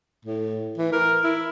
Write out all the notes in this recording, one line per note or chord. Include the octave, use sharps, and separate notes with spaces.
A2
E3
A#4
E4